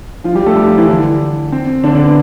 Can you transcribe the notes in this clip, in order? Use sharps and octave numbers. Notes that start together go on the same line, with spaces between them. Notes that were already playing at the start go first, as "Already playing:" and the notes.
F3 F4
G3 G4
A3 A4
G3 G4
F3 F4
E3 E4
D3 D4
C4
D3 D4
D3 D4
B3